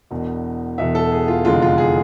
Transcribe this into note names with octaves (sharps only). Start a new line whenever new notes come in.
E1 E2 B2
E1 E2 B2 E5
A4
G#4
F4
F1 E2 D3 G#3 F4
F4
G#4